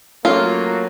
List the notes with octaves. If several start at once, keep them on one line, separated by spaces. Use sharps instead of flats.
F#3 A3 A#3 C#4 F4